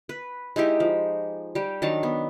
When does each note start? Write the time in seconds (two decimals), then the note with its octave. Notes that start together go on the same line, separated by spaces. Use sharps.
0.09 B4
0.56 G#3 D#4 E4 G4
0.80 F3
1.55 G3 G4
1.82 D#3 F#3 D4 A5
2.03 B3